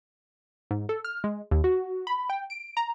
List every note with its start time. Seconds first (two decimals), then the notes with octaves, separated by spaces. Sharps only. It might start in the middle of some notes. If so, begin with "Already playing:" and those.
0.71 G#2
0.89 A4
1.05 F6
1.24 G#3
1.51 D#2
1.64 F#4
2.07 B5
2.30 G5
2.50 D7
2.77 A#5